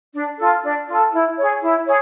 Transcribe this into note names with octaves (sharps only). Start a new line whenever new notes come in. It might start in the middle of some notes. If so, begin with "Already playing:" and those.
D4
F4 A4
D4
F4 A4
E4
G#4 C#5
E4
G#4 C#5